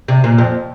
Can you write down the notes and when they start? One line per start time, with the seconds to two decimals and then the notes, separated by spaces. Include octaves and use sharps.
0.08 C3
0.24 A#2
0.38 F2